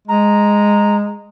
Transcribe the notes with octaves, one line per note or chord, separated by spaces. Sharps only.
G#3 A#5